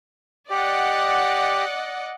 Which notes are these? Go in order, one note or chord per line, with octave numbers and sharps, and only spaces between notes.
G4 D5 D#5 F#5